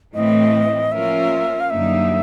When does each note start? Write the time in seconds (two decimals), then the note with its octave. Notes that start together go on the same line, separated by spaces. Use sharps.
0.13 A2 E3 A3 C4 D#5
0.91 F3 A#3 C#4 F4 A#4 E5
1.60 F5
1.69 F#2 D3 G3 A#3 D#4 E5